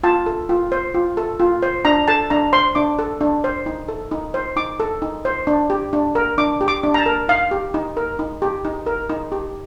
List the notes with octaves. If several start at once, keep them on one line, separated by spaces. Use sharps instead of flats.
F4 A5
A4
F4
C5
F4
A4
F4
C5
D4 A#5
A4 A5
D4 A#5
C5 C6
D4 D6
A4
D4
C5
D#4
A4
D#4
C5
D#4 D6
A4
D#4
C5
D4
G4
D4
A#4
D4 D6
G4
D6
D4
A#5
A5
A#4
D#4 F5
G4
D#4
A#4
D#4
G4
D#4
A#4
D#4
G4